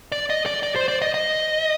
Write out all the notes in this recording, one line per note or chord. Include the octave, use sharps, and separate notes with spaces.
D5
D#5
D5
D5
C5
D5
D#5
D#5